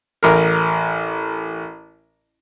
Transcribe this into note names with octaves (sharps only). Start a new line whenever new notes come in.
A1 A#4